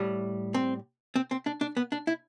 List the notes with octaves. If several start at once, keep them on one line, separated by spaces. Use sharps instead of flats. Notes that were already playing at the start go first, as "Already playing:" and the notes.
Already playing: A2 G3
C4
C4
C4
D4
D4
B3
D4
E4